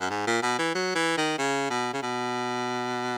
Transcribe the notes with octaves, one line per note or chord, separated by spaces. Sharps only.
F#2
G#2
A#2
B2
E3
F#3
E3
D#3
C#3
B2
C#3
B2